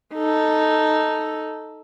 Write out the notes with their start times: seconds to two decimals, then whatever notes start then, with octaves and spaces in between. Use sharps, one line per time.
0.15 D#4 A4